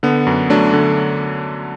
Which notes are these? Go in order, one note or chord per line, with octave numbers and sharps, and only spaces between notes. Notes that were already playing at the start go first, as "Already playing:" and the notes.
D3 B3
F#2
F#3 A3 D4
D3